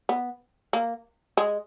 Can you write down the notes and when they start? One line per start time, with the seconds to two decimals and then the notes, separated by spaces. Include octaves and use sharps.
0.09 B3
0.73 A#3
1.37 G#3